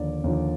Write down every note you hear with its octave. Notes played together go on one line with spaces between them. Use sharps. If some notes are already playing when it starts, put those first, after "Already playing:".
Already playing: D#2 D3 F3 D5
D#2 D3 F3